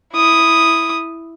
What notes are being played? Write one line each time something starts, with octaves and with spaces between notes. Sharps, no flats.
E4 D#6